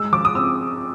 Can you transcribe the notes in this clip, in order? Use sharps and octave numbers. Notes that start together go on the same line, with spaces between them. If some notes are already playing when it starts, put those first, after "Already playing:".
Already playing: G#3 E6
F3 D6
D#6
C4 E6